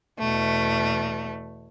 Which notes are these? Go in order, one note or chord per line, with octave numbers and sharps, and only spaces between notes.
E2 B2 A3